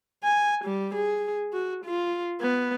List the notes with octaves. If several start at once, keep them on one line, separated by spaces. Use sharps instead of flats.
G#5
G3
G#4
F#4
F4
B3